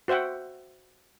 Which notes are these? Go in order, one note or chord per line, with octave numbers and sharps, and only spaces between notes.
F#4 C5 E5 F#5 G5